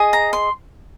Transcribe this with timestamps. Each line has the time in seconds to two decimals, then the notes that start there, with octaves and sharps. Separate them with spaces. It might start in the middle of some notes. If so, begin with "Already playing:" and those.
Already playing: G#4 D#5
0.13 A#5
0.33 C6